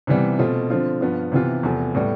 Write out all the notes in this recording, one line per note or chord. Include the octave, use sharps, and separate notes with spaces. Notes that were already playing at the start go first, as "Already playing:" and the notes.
C3 E3 G3 B3
B2 A3 C4 F4
D3 F3 C4 F4
G2 F3 B3 F4
C3 E3 B3 F4
E2 C3 F3 A3
A2 G3 B3